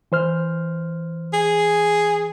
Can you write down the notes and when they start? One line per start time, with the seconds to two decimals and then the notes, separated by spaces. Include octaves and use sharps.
0.12 E3 C5 F6
1.33 G#4